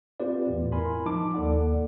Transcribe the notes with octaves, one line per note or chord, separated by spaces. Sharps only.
C4 F4 G4 B4 D5
E2 A2
E4 A#4 G#5 B5 C6
F3 D#4 A5 D6
D#2 A#3 A4 D5 F#5